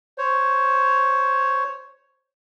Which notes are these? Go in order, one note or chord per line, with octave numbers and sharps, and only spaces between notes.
C5 C#5